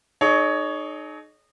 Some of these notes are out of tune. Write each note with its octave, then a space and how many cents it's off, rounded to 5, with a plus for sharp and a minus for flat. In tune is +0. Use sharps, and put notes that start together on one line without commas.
D#4 -25 G#4 +45 C#5 +15